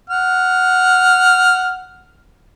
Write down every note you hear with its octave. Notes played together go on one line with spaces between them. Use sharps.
F#5 F6